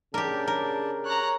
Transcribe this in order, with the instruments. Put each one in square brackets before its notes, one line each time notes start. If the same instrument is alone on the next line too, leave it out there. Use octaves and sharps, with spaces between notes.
[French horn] C#3 [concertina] D4 [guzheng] G4 A#4
[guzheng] A#4
[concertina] C#5 [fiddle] A#5 F#6